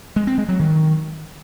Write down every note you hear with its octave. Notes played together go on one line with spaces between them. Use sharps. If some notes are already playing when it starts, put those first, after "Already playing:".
G#3
C4
G#3
F#3
D#3